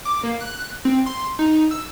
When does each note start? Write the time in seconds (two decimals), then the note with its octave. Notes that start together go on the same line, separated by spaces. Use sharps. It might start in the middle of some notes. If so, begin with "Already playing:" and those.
0.05 D6
0.23 A#3
0.40 F#6
0.85 C4
1.06 C6
1.39 D#4
1.71 E6